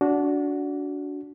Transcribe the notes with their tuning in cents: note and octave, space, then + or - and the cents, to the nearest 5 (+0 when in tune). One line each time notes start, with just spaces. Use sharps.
D4 -20 F#4 +0